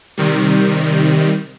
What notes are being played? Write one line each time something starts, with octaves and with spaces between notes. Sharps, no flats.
C3 D#3 G3